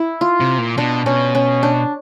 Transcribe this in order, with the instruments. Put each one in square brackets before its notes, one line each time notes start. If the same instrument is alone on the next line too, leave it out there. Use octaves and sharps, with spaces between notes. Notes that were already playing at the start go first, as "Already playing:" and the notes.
Already playing: [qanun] E4
F4
[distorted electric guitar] C3
A#2
[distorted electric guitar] B2 [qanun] D4
[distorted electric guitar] B2 [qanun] C#4
[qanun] C#4
D4